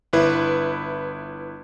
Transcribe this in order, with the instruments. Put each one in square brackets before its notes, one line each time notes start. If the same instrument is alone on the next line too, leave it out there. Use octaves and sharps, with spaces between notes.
[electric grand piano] G1 E4 B4